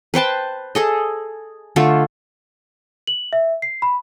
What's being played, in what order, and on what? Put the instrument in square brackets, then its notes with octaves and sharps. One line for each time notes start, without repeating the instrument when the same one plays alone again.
[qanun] B4 C5 G5 A5
G#4 A4 D#5
D3 A3 F4 A4
[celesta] F#7
E5
C7
B5